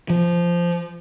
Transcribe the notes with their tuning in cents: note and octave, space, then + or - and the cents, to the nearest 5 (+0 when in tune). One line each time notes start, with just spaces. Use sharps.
F3 -10